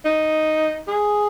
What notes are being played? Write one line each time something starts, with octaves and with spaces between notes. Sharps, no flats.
D#4
G#4